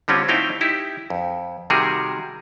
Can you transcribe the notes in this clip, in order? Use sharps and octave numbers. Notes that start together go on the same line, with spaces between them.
D3 G3 C4 C#4 F4
A3 C4 D#4 E4 F5 G5
D#4 E4 G4
F2
C3 D#3 G3 F#4 G#4 A#4